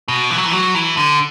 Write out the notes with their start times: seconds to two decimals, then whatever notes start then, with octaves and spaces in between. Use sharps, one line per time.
0.08 B2
0.31 E3
0.37 F#3
0.45 E3
0.52 F#3
0.75 E3
0.97 D3